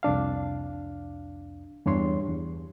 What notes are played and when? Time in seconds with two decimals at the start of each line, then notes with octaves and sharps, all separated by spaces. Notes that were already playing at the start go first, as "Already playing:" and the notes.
0.03 C2 F2 D4 F5
1.86 E2 G2 D4 C#5 C6
2.28 E2